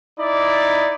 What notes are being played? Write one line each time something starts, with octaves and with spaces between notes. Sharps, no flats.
D#4 E4 D5